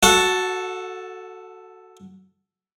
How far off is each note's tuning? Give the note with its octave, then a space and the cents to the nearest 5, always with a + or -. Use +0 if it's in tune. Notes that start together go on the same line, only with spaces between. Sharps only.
F#4 +0 A4 +0 F#5 -35